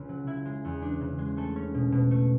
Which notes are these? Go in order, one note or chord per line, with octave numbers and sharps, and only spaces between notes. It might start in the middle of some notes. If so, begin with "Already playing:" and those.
Already playing: C#2 C#3
F#3
C#3 E4
G#3
E2
D4
C#3
G#3
A3 A4
C#4
B2
B2
A3